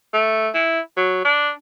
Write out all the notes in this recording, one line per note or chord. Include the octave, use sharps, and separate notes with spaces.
A3
E4
F#3
D4